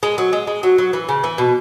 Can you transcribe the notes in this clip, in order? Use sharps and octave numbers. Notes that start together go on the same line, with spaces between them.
G#3
F#3
G#3
G#3
F#3
F#3
E3
C#3
E3
B2